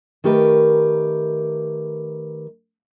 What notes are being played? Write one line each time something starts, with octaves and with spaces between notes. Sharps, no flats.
D#3 A3 G4 A#4 B4